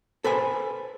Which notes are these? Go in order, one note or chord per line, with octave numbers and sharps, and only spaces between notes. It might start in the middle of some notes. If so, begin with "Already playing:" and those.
A4 B4 C5 G#5